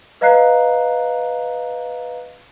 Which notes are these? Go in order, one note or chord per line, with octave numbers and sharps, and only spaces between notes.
B4 D#5 F5 A#5 F#6 C7